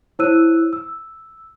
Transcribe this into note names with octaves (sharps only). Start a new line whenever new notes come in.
E4 C5 C#5 E6 F#6 D#7
E6